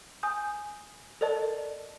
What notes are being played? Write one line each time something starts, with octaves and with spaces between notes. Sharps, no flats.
G#5 D#6 G6
A4 A#4 D5 D#5 A5